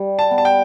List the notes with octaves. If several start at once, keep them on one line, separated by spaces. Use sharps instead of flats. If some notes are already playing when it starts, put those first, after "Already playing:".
Already playing: G3
A5
B3
A5
G5